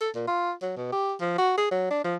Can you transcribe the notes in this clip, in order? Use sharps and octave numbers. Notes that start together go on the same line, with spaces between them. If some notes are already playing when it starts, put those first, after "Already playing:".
A4
A#2
F4
F#3
B2
G4
F3
F#4
G#4
F#3
D4
F3